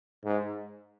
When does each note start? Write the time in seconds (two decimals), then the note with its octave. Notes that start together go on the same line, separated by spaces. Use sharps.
0.24 G#2